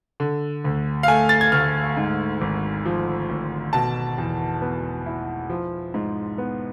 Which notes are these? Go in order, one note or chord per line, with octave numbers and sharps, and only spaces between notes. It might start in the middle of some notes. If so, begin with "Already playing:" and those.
D3
D2
F5
A3 G#5
A6
G#6
D2 F6
G#2
G#1
F3
G#1
B2 A5
E2
B3
E4
F3
G#2
B3